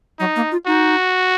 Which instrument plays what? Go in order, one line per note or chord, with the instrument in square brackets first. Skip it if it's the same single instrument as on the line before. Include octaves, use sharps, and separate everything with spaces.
[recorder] F#3 [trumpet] D#4
[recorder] A#3
F4
[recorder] D#4 [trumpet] F#4